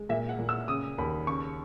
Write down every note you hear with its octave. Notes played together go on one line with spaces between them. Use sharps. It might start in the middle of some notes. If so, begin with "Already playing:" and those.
Already playing: G#3
A#2 E5
F#5
A#2
E6
C#3 D#6
D#2 B5
C#3 C#6